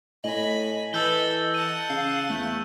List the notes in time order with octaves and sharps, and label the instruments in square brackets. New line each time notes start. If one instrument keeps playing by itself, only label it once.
[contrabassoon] A2 [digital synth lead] D#5 [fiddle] G#5 B5 [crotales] F#7
[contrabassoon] E3 [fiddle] A4 B4 [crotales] E6 G6 G7
[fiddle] F#5 A5 [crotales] D#7
[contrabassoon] C#3 [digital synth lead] F5
[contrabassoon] E2 [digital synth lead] A3